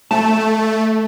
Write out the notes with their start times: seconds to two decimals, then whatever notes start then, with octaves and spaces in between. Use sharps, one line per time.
0.11 A3 A5